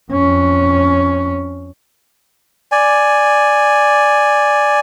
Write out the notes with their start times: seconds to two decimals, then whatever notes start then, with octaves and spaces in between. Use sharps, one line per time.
0.12 F2 C#4
2.72 D5 G#5